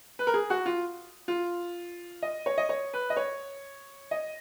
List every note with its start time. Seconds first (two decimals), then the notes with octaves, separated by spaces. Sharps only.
0.19 B4
0.27 A#4
0.34 G#4
0.50 F#4
0.66 F4
1.28 F4
2.22 D#5
2.46 C#5
2.58 D#5
2.69 C#5
2.94 B4
3.10 D#5
3.17 C#5
4.11 D#5